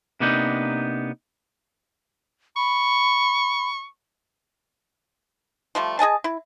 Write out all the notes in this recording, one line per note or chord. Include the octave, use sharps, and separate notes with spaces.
C3 A#3 B3 D4 D#4
B5 C#6
F3 G3 A3
G#4 D#5 G#5 A5
E4